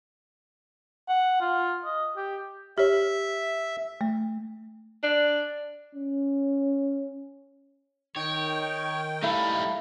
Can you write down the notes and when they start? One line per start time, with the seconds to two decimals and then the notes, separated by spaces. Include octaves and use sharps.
1.08 F#5
1.41 F4
1.85 D#5
2.17 G4
2.78 G4 C#5 E5
4.01 A3
5.03 D4
5.95 C#4
8.16 D#3 D#4 C#5 G5
9.23 G3 A3 D#4 E4 F5